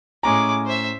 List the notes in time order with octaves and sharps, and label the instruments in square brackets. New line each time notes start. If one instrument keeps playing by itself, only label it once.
[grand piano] A2 C#4 A#5 [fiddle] G#3 D6
[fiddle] C5 E5